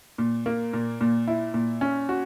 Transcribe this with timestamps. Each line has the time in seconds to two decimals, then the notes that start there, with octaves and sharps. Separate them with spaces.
0.18 A#2
0.46 A#3
0.73 A#2
1.01 A#2
1.28 E4
1.54 A#2
1.81 C#4
2.09 F#4